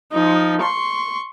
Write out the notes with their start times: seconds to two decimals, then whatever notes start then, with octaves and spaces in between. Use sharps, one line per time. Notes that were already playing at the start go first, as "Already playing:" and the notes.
0.12 F3 D#4
0.61 C6 C#6